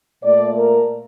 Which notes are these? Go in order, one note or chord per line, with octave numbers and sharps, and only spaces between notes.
A#2 A3 D5
A#4